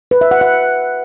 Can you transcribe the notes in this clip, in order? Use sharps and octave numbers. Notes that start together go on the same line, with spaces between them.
B4
E5
F#5
F#5